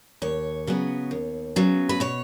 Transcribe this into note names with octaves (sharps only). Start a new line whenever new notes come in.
D#2 C#5
C#3 F#3 B3
D#2
C#3 F#3 B3
B4
B2 C#5